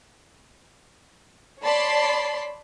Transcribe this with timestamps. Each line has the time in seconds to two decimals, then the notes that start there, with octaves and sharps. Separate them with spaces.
1.61 C#5 D5 A5 B5 C6 C7